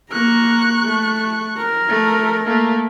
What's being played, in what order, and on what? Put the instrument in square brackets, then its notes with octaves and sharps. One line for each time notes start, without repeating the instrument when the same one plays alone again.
[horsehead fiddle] A#3 A#5 [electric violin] C#6 F#6
[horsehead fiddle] A3
A#4
[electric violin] A3
A3 A#3